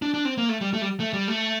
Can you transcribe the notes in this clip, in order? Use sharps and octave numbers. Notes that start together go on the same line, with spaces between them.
D4
D4
C4
A#3
A3
G3
A3
G3
A3
G3
A3